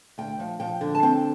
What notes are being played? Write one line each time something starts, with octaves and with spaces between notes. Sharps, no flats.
D2 G5
F3
F3 G5
D3
A5
C4 G5